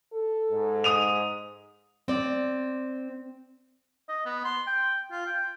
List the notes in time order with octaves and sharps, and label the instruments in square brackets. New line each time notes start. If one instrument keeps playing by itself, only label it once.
[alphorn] A4
[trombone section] G#2
[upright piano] D#6 D#7 F7
[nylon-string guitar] C4 D5
[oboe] D#5
B3
C6
G5
F4
G5